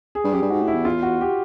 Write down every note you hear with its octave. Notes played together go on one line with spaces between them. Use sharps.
G#4
G2
F#2 G4
G2
G#2 F#4
A2
E4
E2
F4
F#4
G4